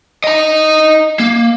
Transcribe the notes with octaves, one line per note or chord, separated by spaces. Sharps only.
D#5 A#5
A#3